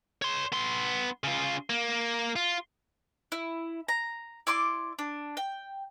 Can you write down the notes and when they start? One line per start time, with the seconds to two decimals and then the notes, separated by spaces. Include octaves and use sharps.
0.22 C#5 C6
0.52 B3 C6
1.24 C#3 F4
1.70 A#3
2.36 F4
3.32 E4
3.88 A#5
4.47 E4 D5 C6 D6
4.99 D4
5.37 G5